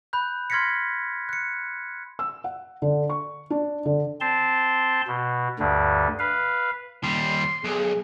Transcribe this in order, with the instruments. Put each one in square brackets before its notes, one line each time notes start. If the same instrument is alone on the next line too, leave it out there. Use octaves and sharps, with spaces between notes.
[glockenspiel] B5 F#6 G6
C6 F6 G#6 A#6 B6 C#7
F#6 C#7
[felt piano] E6
F#5
D3
C#6
D4
D3
[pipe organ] C4 A5 C6
B2
D2 G2 D3
B4 F5
[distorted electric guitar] D#2 G3 [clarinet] C6
[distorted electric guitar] B1 [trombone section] G#4